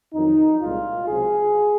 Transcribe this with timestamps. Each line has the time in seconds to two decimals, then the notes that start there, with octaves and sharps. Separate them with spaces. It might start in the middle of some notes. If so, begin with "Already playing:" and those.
0.14 F2 D#3 F#3 D#4
0.60 C2 A#2 G#3 F4
1.07 C#2 C3 F#3 G#4